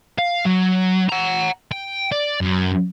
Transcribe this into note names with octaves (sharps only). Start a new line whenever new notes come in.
F5
F#3
F#5 A#5
G5
D5
F#2